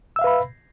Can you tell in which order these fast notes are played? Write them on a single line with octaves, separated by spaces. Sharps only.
E6 E5 F5 B4 B5